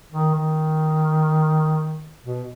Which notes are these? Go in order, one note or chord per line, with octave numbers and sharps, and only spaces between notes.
D#3
D#3
B2